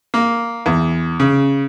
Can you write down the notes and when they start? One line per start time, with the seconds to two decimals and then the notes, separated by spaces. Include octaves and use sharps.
0.14 A#3
0.66 E2
1.20 C#3